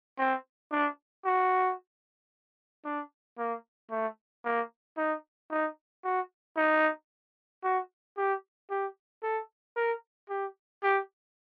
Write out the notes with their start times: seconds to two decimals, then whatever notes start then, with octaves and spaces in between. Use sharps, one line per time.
0.18 C4
0.72 D4
1.25 F#4
2.85 D4
3.38 A#3
3.91 A3
4.45 A#3
4.97 D#4
5.51 D#4
6.04 F#4
6.57 D#4
7.64 F#4
8.17 G4
8.70 G4
9.23 A4
9.76 A#4
10.30 G4
10.83 G4